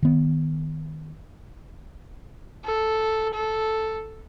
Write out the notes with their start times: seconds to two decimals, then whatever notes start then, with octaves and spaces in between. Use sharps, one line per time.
0.03 D#3 B3
2.65 A4
3.34 A4